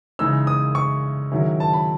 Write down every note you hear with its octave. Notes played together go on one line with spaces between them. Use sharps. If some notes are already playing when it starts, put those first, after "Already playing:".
C#3 E3 G#3 D#4 E6
D#6
C#6
G#2 D#3 F#3 C#4 E4
A5
B5